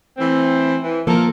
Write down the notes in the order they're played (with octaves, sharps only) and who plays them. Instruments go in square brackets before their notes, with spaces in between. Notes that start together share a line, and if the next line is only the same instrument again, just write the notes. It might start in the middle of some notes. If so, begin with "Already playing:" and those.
[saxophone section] E3 A3 C4
E3
[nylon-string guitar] F3 A#3 [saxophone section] A4 A#4